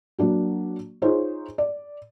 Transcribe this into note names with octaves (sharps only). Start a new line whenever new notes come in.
F#3 A#3 D4 F#4
D#4 F4 G#4 C5 C#5
D5